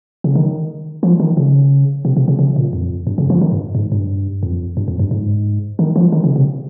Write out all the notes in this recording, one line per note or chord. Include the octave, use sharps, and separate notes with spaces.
C#3
D#3
F3
D#3
C#3
C3
C3
C#3
C#3
A#2
F2
G2
C#3
F3
D#3
G2
G#2
G2
F2
G2
F2
G2
G#2
D#3
F3
D#3
C#3
C3